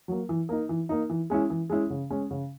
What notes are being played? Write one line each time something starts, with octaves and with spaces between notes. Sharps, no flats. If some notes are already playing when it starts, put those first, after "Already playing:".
F#3 A#3
E3
A#3 D#4
E3
A#3 D#4
E3
G#3 C#4 E4
E3
G#3 C#4 E4
C#3
G#3 C#4
C#3